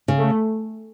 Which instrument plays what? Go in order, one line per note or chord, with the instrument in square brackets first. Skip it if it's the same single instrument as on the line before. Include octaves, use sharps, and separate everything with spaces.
[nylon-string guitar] C#3
[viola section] A3